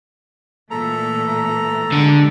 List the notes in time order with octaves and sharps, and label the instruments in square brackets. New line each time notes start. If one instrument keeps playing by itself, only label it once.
[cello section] A#2 E3 A3 [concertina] A4 A#5
[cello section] A#2 G#3 G4 [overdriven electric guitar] D3